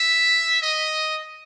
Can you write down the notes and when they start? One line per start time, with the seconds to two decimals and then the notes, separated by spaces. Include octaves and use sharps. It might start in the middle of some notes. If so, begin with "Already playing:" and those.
Already playing: E5
0.62 D#5